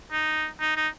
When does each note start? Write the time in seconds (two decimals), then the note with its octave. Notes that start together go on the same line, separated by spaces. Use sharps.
0.12 D#4
0.61 D#4
0.76 D#4